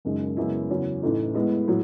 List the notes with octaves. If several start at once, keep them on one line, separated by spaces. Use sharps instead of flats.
F#1 F#2 D#3 G#3
F#2 C#3 G#3 B3 E4
E2 C#3 F#3 C#4
A1 A2 E3 A3 D#4
A2 G#3 B3
A2 F#3